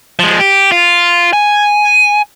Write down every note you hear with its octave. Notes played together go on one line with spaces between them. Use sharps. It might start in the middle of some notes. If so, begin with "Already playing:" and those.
F3 G#3
G4
F4
G#5